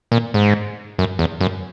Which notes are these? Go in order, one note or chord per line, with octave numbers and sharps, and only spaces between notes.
A#2
G#2
F#2
E2
F#2